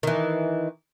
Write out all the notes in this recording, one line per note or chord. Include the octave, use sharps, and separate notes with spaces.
D#3 E3